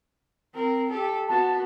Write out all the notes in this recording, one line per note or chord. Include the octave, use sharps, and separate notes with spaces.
C4 A#4
G4 A4
B3 F#4 A5